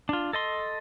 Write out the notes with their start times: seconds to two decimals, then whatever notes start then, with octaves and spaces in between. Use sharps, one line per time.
0.09 D4 F4
0.33 A4 D#5 C6